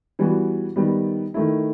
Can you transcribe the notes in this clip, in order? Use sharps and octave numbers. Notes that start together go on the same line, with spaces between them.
E3 G3 B3 F#4
D#3 G3 B3
D#3 A3 E4